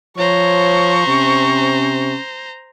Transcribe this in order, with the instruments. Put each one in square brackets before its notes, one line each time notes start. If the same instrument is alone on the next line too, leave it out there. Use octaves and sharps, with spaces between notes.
[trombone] F3 [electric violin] C5 A#5 [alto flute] C#5 [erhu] C#6
[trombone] C3 [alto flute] C#4